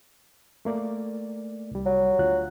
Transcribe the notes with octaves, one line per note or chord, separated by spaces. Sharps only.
A3 A#3 D5
C2 G3
F#3
D2 F4 F#6